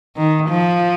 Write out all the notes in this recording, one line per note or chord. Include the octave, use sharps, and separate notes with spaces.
D#3
F3